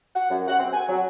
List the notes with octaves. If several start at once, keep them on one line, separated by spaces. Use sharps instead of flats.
F#5
F#2
F#5
C4
G#5
F#3